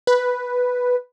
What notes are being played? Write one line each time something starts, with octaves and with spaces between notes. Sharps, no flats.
B4